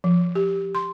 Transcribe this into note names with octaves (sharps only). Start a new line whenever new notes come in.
F3
G4
C6